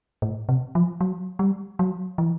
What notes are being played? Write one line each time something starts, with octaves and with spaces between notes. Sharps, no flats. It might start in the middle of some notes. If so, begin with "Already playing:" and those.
A2
C3
F3
F#3
G3
F#3
E3